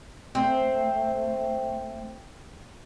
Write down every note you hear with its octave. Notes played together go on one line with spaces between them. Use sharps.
A3 C4